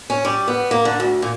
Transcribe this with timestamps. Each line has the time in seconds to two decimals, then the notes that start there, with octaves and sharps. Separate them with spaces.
0.10 C#4
0.25 G3
0.48 B3
0.71 A#3
0.85 D3
1.00 D2
1.22 A#2